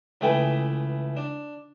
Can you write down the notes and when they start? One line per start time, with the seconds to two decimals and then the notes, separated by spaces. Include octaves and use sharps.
0.21 C#2 E3 A3 G#4 B4 G5
1.17 D4